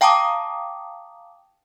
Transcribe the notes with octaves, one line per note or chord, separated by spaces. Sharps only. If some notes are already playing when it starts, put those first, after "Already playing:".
F5 G5 A5 A#5 D6 D#6